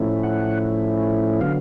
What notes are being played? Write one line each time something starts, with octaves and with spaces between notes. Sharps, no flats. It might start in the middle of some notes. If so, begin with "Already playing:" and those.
Already playing: A2 F3 A3 C#4 E4
F#5
D3 F#3 B3 F5